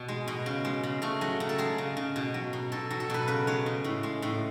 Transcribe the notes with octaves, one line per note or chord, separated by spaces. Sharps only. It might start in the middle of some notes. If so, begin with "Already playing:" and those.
Already playing: B2 B3
G#3
B2
C#3
G#3
C#3
C#3 A3
F#3
C#3
A4
G#3 G#4
C#3
C#3
B2
F#3
B2
B2 A4
F#3
A4
B2 B4
C#3 B4
G#3 C#5
C#3
A2
G#3
A2